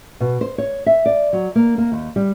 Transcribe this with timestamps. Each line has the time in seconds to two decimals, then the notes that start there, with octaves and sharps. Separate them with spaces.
0.20 B2
0.41 C5
0.58 C#5
0.86 E5
1.06 D5
1.33 F#3
1.56 A#3
1.78 A#3
1.92 D#2
2.16 G3